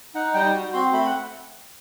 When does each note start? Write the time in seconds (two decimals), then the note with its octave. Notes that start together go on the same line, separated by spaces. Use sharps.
0.14 D#4 F#5
0.34 G3 G5
0.54 F#4
0.73 C4 C6
0.93 A3 B5
1.06 F#5